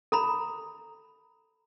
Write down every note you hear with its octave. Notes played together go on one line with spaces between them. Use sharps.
A4 A#5 B5